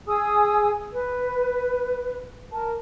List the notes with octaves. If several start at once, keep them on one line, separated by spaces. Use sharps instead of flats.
G#4 G#5 D#6 E6
B4
A#4 A5